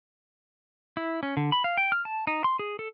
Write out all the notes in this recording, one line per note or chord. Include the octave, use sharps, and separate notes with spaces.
E4
C#4
D3
B5
F5
G5
F6
A5
D#4
C6
G#4
A4